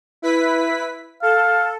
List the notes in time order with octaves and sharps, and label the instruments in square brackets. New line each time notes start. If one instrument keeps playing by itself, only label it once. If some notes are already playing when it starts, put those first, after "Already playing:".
[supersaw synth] E4 B4 B6
[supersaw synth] A4 [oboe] F5